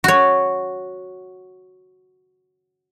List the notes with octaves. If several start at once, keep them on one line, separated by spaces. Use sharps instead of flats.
F#4 C#5